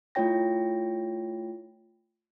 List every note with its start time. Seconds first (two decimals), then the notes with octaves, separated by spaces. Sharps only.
0.15 A3 E4 F4 C#5 G5 A#6